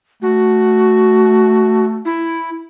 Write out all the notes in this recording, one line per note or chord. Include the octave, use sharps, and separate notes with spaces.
A3 F#4
E4